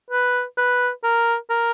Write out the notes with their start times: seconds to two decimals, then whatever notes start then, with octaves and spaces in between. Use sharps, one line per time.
0.11 B4
0.58 B4
1.04 A#4
1.50 A#4